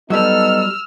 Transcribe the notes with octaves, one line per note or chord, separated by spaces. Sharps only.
F#3 G3 B3 D#4 A4 E6 F6